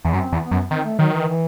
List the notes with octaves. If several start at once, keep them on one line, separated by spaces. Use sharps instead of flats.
E2
F#2 C4
E2
B3
F#2
D#3 C4
A3
D#3 F#3
E3
E3